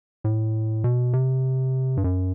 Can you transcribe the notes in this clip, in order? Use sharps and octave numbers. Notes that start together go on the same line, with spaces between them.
A2
B2
C3
G2
F#2